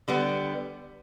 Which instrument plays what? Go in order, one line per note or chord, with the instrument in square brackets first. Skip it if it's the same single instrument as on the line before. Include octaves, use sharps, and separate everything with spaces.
[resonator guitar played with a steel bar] D3 G3 B3